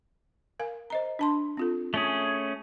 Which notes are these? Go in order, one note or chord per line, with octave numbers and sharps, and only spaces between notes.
A#4 F5 G#5
C5 D#5 A#5
D4 A5 C6
C4 F4 A4
A3 C#4 G#4